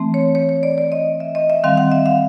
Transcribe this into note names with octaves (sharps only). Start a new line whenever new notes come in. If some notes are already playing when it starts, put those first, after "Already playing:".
Already playing: E3 A3 C4
C#5
C#5
C#5
D5
D5
D#5
E5
D#5
E5
D#3 G3 C4 F5
F#5
E5
F5